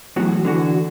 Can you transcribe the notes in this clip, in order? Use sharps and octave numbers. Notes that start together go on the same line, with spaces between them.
E2 A2 F#3 F#4
D3 E3 F#4